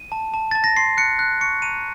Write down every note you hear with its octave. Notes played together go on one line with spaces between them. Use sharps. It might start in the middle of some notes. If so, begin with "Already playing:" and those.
Already playing: D#7
A5
A5
A5 A6
A#6
C6 C7
F#6 C#7
F#6
C#6 C#7
A#5 D#7